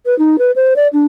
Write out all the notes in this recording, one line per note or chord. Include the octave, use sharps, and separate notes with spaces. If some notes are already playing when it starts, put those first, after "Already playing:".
B4
D#4
B4
C5
D5
D4